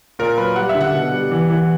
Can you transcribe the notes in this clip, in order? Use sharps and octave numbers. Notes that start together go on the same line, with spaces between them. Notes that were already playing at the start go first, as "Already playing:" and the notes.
A#2 A#4
F#3 B4
G3 F#5
E5
D3
F#5
B2
G3
E3
E3